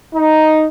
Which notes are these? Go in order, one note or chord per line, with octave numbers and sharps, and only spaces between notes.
D#4